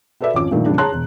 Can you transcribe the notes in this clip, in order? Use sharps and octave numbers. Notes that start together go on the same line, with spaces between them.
F#4 A4 B4 D5 E5
G#1 F2 F3 C#4 D6
G2 A#2 D#3 F3 A3
F2 C#3 G3 A#3 D4
G#4 C#5 A5 A#5 C6 F#6
E1